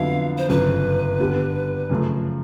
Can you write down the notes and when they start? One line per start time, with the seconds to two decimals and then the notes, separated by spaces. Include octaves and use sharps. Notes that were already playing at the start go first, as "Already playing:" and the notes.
Already playing: F2 D3 F#3 B3 E4 F5
0.38 C5
0.49 G1 F#2 C#3 B4
1.20 G2 D3 G3 B3
1.90 F#2 C#3 F3 A3